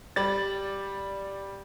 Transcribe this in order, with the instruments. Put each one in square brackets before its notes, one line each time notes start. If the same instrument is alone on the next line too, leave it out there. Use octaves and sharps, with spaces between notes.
[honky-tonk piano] G3 D5 A6